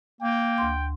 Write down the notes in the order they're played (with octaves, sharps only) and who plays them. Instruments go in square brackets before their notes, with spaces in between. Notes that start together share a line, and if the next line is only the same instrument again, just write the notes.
[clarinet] A#3 [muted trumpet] G5
[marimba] D2 C6